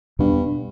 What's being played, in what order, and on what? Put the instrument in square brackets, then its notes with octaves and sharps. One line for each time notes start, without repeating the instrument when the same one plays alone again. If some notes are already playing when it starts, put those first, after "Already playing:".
[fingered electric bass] E2 B2 B3 D4 [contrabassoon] G2